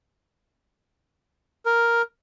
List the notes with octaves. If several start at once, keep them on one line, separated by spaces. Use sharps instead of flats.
A#4